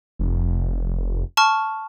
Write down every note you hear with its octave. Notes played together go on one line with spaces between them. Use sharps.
F1
A5 C#6 F6